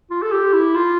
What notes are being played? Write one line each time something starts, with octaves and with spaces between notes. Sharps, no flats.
F4
A4
G4
E4
F4